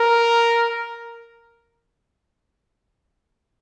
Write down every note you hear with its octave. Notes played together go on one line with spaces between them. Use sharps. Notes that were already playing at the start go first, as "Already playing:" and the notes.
Already playing: A#4